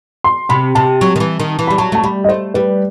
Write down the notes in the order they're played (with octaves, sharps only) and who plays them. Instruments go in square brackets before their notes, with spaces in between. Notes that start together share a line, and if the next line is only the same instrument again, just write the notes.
[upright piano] C6
[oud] C3 [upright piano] B5
[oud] C3 [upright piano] A5
[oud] F#3
D#3
E3
D#3
E3
[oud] G3 [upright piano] B5
[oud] F#3 [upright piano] A5
[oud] A3 [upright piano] A5
[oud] G3 [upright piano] B5
[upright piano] D#5
[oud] A3 [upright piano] C5
[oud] G3 [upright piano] B4